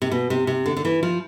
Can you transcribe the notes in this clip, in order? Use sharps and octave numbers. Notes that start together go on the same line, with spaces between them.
C3
B2
C3
C3
D3
D3
E3
F3